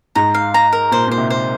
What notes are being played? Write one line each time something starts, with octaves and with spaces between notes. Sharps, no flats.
G#2 A#5
F5
A#5
A#4
A#2 C5
A#2 C5
C3
C5